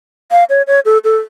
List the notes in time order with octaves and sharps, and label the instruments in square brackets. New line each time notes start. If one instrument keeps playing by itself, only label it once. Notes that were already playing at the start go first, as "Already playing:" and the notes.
[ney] F5
C#5
C#5
A4
A4